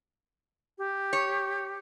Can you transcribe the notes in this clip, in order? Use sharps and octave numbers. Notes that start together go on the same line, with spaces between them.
G4
C#5